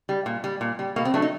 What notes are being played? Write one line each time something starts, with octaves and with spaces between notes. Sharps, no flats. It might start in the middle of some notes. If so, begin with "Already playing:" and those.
G3
A#2
G3
A#2
G3
B2 A#3
C4
F#3 A3 D4
D#4